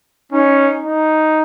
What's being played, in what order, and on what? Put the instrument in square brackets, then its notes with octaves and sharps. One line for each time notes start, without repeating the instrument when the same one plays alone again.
[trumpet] C#4 [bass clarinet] D#4
[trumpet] D#4